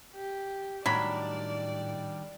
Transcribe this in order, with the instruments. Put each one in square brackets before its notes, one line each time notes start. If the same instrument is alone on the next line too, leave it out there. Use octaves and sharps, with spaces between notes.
[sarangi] G4
[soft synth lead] A2 [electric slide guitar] D#3 G3 D4 [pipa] F#3 B5 [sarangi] D5